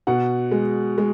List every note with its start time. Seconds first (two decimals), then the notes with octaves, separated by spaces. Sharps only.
0.07 B2 F#5
0.51 G#3
0.98 G#3